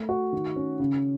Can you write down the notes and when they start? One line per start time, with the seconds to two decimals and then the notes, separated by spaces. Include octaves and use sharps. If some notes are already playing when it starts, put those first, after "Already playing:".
Already playing: A3
0.09 F#4
0.33 D#3
0.56 C#4
0.80 C#3